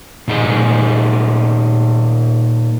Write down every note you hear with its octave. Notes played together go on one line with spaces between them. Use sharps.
A#2 D#4 G#4 D#5